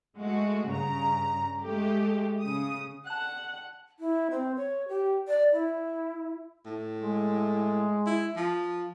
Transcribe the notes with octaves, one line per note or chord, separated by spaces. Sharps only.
G#3 A3 F#4
G2 C#3 A#5
G#3 A3 G4
C#3 D#6
F#5 A5 F#6
E4
C4
C#5
G4
D5
E4
A2
G#3
E4
F3